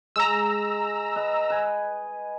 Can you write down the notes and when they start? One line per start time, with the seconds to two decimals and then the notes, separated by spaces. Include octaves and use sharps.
0.16 G#3 A#5 E6
1.16 B4 D#5
1.50 B4 G#5